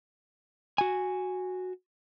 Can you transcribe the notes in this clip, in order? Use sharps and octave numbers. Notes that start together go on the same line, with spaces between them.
F#4 G#5